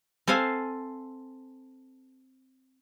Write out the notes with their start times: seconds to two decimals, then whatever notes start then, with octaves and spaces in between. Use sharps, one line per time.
0.27 C4 A4 C5 F5 G#5